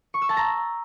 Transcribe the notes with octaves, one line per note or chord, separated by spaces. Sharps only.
C#6
E6
A5
A#5